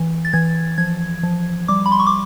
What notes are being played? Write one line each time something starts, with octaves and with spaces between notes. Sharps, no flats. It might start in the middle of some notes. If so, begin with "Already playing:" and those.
Already playing: E3
A6
E3 G#6
F3 G#6
F3
G3 D6
B5
C6
C#6
D6